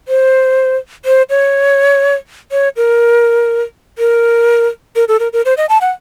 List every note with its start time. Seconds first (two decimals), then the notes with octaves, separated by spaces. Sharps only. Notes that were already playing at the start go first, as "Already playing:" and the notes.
0.08 C5
1.05 C5
1.30 C#5
2.52 C#5
2.76 A#4
3.98 A#4
4.96 A#4
5.08 A4
5.20 A#4
5.33 A#4
5.45 C5
5.57 D#5
5.69 A5
5.81 F#5